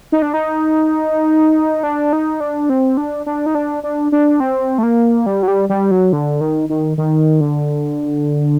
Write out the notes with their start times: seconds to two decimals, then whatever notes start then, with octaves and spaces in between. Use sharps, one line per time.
0.12 D#4
0.22 D4
0.34 D#4
1.83 D4
2.13 D#4
2.40 D4
2.69 C4
2.97 D4
3.26 D4
3.46 D#4
3.55 D4
3.83 D4
4.12 D4
4.40 C4
4.78 A3
4.83 A#3
5.26 G3
5.43 F#3
5.48 G3
5.69 G3
5.91 F#3
6.13 D3
6.41 D#3
6.69 D#3
6.98 D#3
7.41 D3